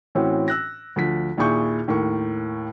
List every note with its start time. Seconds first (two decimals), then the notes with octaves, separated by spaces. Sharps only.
0.15 A2 E3 C4 C#4 F#4
0.48 E6 F#6 A#6
0.96 D2 F3 B6
1.37 D#2 A#2 E4 G#4 C#6 G6
1.88 D#2 A2 A#4 C#6